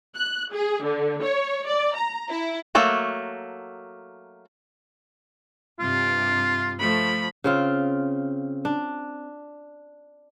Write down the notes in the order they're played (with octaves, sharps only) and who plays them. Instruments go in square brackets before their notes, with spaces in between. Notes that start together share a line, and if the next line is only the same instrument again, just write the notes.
[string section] F#6
G#4
D3
C#5
D5
A#5
E4
[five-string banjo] F#3 A3 A#3 F#4
[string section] G2 C3 [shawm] F4
[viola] F3 B5 [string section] A3
[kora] C#3 C4 F4
D4